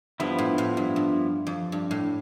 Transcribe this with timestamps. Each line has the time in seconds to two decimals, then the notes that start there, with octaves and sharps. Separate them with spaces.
0.20 G2 F3 B3 E4
0.39 A2
0.58 A2
0.77 G2
0.96 G2
1.47 F2
1.72 G2
1.91 A2